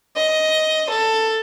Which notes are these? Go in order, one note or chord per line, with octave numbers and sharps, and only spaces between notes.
D#5
A4